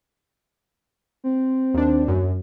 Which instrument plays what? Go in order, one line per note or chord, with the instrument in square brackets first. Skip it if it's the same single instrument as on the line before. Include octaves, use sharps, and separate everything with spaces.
[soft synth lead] C4
[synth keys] D#2 D4
F#2